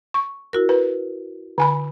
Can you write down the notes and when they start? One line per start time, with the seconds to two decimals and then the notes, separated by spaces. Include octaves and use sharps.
0.14 C#6
0.53 E4 F#4 A#4
0.69 B4
1.58 D3 G#5 B5